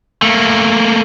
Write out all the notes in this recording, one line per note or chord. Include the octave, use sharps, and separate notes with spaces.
A3 A#3